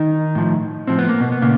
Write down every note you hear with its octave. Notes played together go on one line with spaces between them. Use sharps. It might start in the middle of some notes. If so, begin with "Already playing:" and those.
Already playing: D#3 D#4
A2 F3
A2 F3 C4
B3
A#3
B2 B3
B3
A#2 C#3 A#3